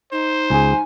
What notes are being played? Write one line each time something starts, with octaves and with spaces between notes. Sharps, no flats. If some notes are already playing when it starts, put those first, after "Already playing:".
D#4 C5
C#2 G#4 G#5